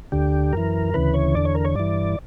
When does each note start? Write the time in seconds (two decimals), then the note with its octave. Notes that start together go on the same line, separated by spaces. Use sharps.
0.12 D2 D3 G4
0.53 F#2 E3 A#4
0.94 D2 C#3 E3 B4
1.14 C#5
1.34 E2 D3 D5
1.45 C#5
1.55 A#4
1.65 C#5
1.75 G2 E3 D5